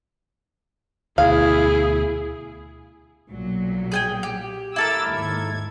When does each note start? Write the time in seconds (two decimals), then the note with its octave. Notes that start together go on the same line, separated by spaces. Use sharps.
1.18 D2 B2 E4 G#4 F5
3.28 B1 A#2 F#3
3.92 G#4 G5 G#5
4.23 G4
4.76 E4 A4 A#4 D6 E6 A6
5.10 D#2 G#2 G#6